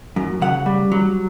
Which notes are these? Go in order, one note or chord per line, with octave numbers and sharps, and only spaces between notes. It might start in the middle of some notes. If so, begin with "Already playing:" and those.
F#2
C#3 F#5
G3
F#3